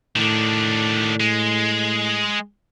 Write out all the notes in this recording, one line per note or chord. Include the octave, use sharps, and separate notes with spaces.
A2 D#3 D4
G#3